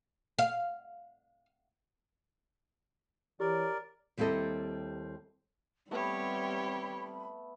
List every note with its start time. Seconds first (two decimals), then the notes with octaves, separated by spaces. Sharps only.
0.39 F5
3.40 E3 G4 A#4 C#5 D5
4.17 D#2 G3 C4 E4 A4 D#5
5.91 G3 A3 B3 C4 G4 C#5 B5